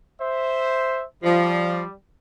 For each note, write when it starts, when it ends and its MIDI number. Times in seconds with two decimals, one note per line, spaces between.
0.22 1.05 72
0.22 1.05 76
1.23 1.81 53
1.23 1.93 55
1.23 1.93 74